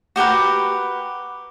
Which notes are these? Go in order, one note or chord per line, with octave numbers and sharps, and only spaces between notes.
F#4 G4 A#4 B4